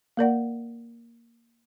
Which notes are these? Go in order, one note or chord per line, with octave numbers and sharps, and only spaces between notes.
A#3 A#4 D5 F#5